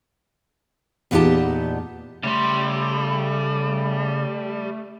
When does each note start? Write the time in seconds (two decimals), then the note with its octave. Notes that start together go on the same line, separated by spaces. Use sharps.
1.11 E2 A#2 B3 D#4 G4 A5
2.24 C#3 G3 A3 C6